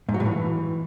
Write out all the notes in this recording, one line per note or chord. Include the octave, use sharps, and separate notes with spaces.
G#2
F#3
A2
E3